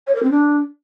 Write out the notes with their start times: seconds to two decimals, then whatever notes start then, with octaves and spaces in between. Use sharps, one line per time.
0.07 C#5
0.15 A#4
0.23 C4
0.31 D4